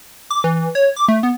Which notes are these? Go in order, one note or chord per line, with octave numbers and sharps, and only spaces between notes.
D6
E3
C#5
D6
A3
B3